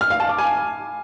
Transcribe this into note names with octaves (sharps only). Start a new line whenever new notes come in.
F6
F5
A5
D6
G#5